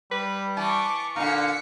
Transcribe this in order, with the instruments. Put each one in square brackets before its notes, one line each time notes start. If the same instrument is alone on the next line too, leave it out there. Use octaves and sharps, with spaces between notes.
[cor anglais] G3 [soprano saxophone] B4
[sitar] E3 [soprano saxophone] A5 [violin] C#6 D6
[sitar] A#2 D3 [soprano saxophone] D#4 [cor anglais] F5 [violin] B6 C#7